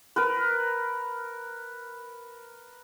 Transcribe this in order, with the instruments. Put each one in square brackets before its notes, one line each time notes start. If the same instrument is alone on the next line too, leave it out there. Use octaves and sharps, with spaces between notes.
[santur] A#4 B4